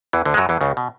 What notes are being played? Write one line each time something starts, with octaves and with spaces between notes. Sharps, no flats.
E2 E3
D2 D3
G#3
F#2 F#3
E2 E3
C#2 C#3
B2